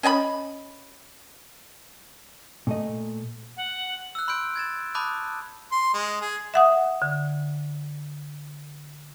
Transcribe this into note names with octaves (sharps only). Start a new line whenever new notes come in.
C#4 D#5 G#5 B5
A#2 A3 D#5
F#5
E6 F#6
B5 C6 F6 G6 D7
G#6 A6 E7
A5 B5 D6 D#6 F#6 G6
C6
G#3
G#4
E5 F#5 D#6
D3